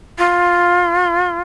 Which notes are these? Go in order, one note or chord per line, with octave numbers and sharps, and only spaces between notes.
F4